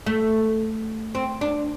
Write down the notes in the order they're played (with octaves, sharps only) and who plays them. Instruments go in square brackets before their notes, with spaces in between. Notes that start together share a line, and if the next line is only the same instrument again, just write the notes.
[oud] A3
C4
D4